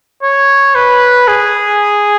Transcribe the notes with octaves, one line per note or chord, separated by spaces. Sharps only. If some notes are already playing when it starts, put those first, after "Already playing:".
C#5
B4
G#4